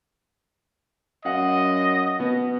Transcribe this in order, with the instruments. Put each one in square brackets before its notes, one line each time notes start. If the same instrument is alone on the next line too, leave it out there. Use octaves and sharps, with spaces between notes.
[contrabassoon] F#2 [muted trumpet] D#5 [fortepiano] F5 F#5
[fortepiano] B2 B3